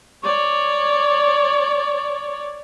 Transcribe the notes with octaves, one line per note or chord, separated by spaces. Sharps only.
C#5 D5